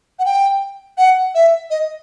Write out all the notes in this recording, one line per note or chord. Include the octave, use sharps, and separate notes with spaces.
F#5
G5
F#5
E5
D#5